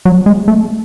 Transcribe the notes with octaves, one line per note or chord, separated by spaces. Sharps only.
F#3
G#3
A3